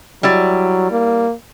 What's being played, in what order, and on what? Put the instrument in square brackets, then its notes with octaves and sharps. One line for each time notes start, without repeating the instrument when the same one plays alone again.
[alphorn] F#3 [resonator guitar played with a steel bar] G3 E4 D5
[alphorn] A#3